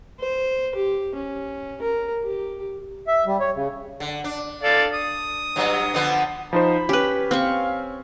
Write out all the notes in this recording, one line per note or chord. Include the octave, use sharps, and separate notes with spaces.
C5
G4
C#4
A#4
G4
E5
G3
C#5
C#3
D3
D4
A4 D5 F5
D#6
G2 F#3
D3 F3 B3
F3 D#4 C5 B5
C#4 G4 B4
C4 F5 C#6